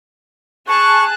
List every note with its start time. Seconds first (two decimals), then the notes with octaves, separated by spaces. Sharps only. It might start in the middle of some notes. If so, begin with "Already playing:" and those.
0.68 G#4 A5 C#6 F#6